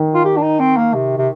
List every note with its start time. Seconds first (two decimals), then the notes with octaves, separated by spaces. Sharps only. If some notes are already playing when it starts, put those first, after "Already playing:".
Already playing: D#3
0.14 F4
0.25 G4
0.37 D4
0.42 D#4
0.59 C4
0.77 A#3
0.94 C3
1.18 C3